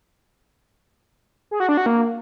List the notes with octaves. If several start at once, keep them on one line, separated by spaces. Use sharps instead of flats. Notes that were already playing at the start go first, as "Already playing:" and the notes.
G#4
F#4
D4
F#4
A#3